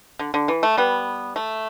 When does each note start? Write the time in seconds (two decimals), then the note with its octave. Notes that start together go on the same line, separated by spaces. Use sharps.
0.19 D3
0.34 D3
0.48 E3
0.63 A3
0.77 G3 B3
1.36 A3